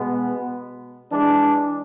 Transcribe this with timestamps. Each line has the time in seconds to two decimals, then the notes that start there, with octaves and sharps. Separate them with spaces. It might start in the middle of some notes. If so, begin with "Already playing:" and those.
Already playing: B2 G#3 B3
1.10 E3 G#3 D4